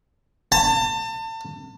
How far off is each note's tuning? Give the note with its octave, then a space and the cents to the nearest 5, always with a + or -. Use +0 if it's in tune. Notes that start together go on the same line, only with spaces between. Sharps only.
A5 +35